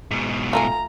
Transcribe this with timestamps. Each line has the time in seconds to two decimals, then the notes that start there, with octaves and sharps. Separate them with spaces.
0.11 G#2 B2
0.53 A3 F4 G#5 A#5